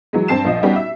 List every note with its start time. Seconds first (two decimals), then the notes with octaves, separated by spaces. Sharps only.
0.13 E3 F#3 G#3
0.28 G2 C4 A5 C7 E7
0.45 A#1 F3 D#5
0.63 G3 B3 C#4 D#4 F#4 G4
0.76 E5